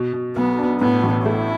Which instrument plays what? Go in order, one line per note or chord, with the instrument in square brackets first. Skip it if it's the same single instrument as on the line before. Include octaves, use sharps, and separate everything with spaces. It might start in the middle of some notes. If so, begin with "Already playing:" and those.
Already playing: [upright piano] B2
B2
[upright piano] B1 [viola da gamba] B3
[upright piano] D4
[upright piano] A2 [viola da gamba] B3
[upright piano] A1
[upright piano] A3 [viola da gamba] E4